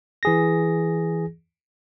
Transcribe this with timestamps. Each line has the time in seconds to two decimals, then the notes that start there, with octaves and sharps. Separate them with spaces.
0.23 E3 G#4 A#6